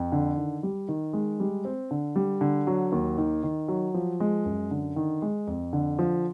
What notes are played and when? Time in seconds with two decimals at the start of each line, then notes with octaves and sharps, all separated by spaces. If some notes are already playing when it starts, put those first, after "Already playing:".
Already playing: F2
0.12 D3
0.37 D#3
0.63 G3
0.88 D#3
1.13 G#3
1.40 G3
1.65 C4
1.91 D3
2.16 G3
2.41 D3
2.67 F#3
2.92 D#2
3.18 D#3
3.43 D#3
3.68 F#3
3.94 F3
4.20 G#3
4.45 F#2
4.71 D3
4.96 D#3
5.22 G#3
5.47 F2
5.73 D3
5.99 F3